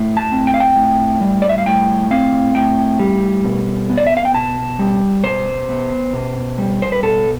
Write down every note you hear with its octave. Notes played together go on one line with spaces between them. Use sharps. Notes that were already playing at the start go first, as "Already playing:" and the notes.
Already playing: A2
A5
C4
G5
F5
G5
A2
G3
D5
E5
F5
A2 G5
C4 F5
A2 G5
G3
B2
B3
D5
E5
F5
G5
B2 A5
G3
B2 C5
B3
B2
G3
C5
B4
B2 A4